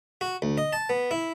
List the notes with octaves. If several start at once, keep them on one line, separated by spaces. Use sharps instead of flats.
F#4
D2
D#5
A5
B3
E4